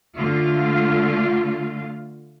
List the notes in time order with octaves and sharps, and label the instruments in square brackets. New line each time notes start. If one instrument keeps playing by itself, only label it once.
[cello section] D3 A3 F4 F5